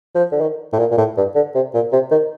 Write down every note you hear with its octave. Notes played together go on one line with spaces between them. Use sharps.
F3
D3
D#3
A2
A#2
A#2
A2
G2
D3
C3
A#2
C3
D#3